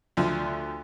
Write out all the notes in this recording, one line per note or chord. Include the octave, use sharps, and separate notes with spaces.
D2 F3